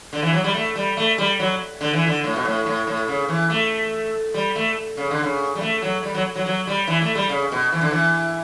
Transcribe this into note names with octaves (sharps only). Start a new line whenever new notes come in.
D3
E3
F#3
G3
A3
G3
A3
G3
F#3
D3
E3
D3
A2
B2
A2
A2
A2
C#3
E3
A3
G3
A3
C#3
D3
C#3
G3
A3
F#3
G3
F#3
F#3
F#3
G3
E3
A3
G3
C#3
B2
E3
D3
E3